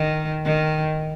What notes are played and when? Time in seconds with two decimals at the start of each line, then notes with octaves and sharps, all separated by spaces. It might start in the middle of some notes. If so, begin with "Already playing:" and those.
Already playing: D#3
0.45 D#3